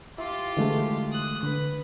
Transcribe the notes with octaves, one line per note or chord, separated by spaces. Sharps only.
E4 F4 G4
D3 E3 G#3 A3
D#6 F#6
D3 B4